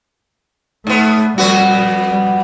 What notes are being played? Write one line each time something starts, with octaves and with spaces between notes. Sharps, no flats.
G#2 A3 B3
F2 G3 B3 F#4
G3